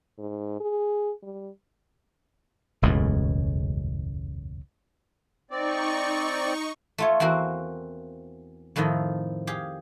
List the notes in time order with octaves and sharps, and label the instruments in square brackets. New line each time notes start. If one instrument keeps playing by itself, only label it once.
[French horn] G#2
G#4
G3
[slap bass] E1 C#2 F#2 A2
[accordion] C4 D5 [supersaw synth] D#4 C#6
[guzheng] A3 F4 C#5
E2 A#3 C4 F#4
F2 A2 D#3 F3 D#5
G4 G#4 F5